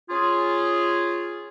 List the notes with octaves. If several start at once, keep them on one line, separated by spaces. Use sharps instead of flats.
C#4 F4 G#4